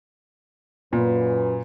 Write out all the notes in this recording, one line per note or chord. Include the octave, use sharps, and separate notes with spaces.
F#2 A#2 B4